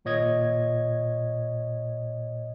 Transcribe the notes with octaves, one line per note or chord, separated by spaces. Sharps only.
G#1 A#2 C#5 D#5 G#6